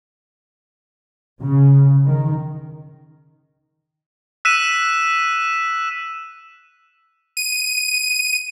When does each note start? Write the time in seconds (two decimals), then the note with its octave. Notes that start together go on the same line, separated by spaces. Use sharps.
1.43 C#3
2.06 D#3
4.45 E6 F#6 B6 D#7 E7
7.37 D#7